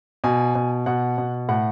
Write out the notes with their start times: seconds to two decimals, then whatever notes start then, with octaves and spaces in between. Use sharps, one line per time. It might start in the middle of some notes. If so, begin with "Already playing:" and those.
0.24 B2 G#5
0.55 B2
0.86 B2 F#5
1.18 B2
1.49 A2 F#5